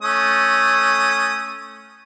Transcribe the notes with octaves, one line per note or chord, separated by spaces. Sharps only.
A3 C#4 D#6